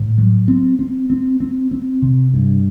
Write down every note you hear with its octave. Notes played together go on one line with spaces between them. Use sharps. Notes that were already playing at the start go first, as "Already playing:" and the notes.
Already playing: A2
F#3
C4
C4
C4
C4
C4
C3
G2